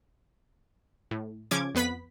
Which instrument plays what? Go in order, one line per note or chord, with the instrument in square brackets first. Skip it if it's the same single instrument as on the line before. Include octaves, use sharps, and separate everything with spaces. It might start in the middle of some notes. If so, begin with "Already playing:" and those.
[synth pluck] A2
C#3 F3 C#4 D6 G#6
F2 B3 B4 B5 B6